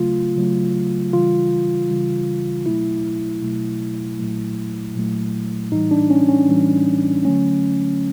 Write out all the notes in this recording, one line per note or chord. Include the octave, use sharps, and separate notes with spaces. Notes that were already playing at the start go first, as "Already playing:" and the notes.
Already playing: C#3 F#3 A3 F4
C#3 F#3 A3
C#3 E3 G3 F4
C#3 E3 G3
B2 F#3 A3 E4
B2 F#3 A3
A#2 F#3 A3
A#2 F#3 A3
A2 E3 G3 D#4
D4
C#4
C#4
A2 E3 G3
D3 F#3 A3 C#4